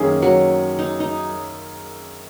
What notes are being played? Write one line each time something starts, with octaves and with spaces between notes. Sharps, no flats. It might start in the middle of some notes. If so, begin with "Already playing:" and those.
Already playing: F#2 D#3 A#3 C#4 G#4
F#3
D#4
D#4